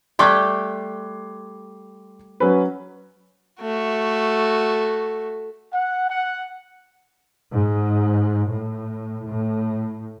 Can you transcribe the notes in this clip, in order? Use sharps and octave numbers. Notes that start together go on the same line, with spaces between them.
G3 A3 G4 C6 F#6 G#6
F#3 C#4 B4
A3 F#4
F#5
F#5
G#2
A2
A2